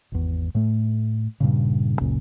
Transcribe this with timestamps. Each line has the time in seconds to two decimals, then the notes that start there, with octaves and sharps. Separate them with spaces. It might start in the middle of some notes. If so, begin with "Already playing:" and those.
0.12 G#1 E2
0.55 A2 A3
1.40 G2 A#2 C#3
2.00 F#1 C#2 A#2 C#3